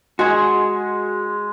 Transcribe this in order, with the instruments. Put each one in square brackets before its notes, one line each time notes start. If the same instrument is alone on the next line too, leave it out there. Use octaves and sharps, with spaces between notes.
[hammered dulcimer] G#3 [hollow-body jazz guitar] F#4 G#4